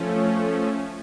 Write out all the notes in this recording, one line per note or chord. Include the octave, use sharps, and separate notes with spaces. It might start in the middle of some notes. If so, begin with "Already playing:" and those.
Already playing: F3 A3 C#4